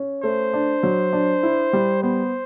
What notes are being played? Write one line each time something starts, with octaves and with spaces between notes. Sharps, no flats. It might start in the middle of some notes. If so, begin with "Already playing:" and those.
Already playing: C#4
A3 C5
D4
F#3
D4
E4
G3
B3 C5